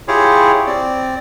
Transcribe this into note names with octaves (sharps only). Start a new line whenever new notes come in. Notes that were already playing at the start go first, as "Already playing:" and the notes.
E4 F4 G4 G#4 C#5
C4 D5